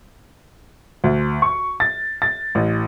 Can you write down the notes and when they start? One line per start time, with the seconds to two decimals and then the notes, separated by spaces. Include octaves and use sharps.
1.04 D2
1.42 C#6
1.80 A6
2.22 A6
2.55 A1